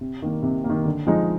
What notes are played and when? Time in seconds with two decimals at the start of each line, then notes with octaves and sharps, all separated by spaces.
0.01 C3
0.22 D#3 A#3
0.43 C3
0.64 A#3
0.70 D#3
0.85 D3
1.07 F3 G#3 D#4